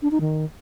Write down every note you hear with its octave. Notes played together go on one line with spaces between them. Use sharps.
D4
D#4
D#3